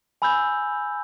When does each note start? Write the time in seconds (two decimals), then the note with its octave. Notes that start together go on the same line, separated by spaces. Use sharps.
0.22 G#5 B5 E6 G6